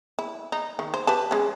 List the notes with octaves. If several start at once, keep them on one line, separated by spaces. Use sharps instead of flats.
E4
D#4
D#3
C5
G4 B4 A5
G#3 C#4